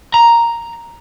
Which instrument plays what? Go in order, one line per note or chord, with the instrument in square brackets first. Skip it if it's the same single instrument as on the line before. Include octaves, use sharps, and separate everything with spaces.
[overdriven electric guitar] A#5